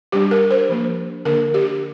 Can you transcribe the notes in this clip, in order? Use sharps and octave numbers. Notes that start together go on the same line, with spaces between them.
G3 D4 G4
A#4
C5
F3 A#3 D4
D3 A#3 D4 A#4
G4